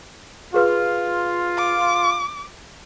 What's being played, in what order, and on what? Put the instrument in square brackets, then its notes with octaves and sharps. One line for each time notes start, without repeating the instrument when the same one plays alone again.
[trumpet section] F4 [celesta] G#4 B4 F6
[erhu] D6